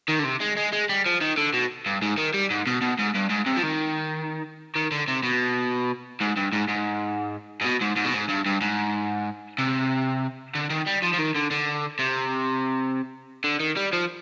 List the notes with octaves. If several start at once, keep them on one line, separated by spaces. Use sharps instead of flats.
D#3
D3
C3
G#3
G#3
G#3
G3
F3
D#3
D3
B2
G2
G#2
D#3
G3
G#2
B2
B2
G#2
G2
G#2
C3
F3
D#3
D#3
D3
C3
B2
G#2
G2
G#2
G#2
G#2
B2
G#2
G#2
B2
G#2
G2
G2
G#2
C3
D3
D#3
G3
F3
F3
D#3
D3
D3
C3
D3
D#3
G3
F3